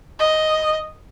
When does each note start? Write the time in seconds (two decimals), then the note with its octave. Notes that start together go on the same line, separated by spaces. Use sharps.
0.19 D#5